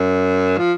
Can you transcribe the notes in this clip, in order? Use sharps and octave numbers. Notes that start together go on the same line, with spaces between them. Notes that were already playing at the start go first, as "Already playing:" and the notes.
Already playing: F#2
F3